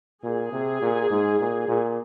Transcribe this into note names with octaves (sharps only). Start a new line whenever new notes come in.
A#2 G#4
C3
A#2
G#2
A#2
A#2